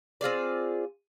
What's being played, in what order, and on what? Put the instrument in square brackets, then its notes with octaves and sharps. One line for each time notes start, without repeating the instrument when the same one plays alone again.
[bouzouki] C4 F4 G#4 D5